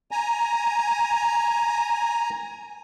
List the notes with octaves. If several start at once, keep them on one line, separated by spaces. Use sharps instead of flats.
G#5 A#5